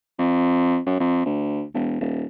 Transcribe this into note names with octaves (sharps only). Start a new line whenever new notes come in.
F2
F#2
F2
D2
E1
D#1